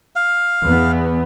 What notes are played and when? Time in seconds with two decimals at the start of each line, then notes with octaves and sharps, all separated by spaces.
0.16 F5
0.63 E2 B3